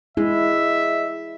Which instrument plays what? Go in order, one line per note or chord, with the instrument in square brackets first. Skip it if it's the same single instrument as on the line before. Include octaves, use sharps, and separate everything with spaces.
[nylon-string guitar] G#3 [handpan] E4 [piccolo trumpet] E5